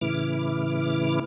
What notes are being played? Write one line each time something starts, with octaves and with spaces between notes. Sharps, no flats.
A2 C#3 E3 E4 D6 F6